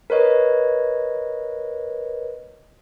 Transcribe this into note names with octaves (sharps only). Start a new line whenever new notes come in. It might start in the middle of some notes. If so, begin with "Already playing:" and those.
A#4 B4 C#5 D#5